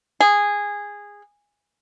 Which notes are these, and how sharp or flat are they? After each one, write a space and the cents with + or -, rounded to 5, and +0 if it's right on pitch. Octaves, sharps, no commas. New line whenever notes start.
G#4 -15